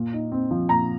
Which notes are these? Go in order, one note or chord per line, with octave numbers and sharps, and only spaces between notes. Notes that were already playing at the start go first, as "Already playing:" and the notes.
Already playing: A#2
D#4
C4
F3
A#2 A#5